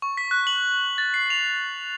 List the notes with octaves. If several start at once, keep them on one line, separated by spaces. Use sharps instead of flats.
C#6
B6
F#6
F#7
A6
C7
F7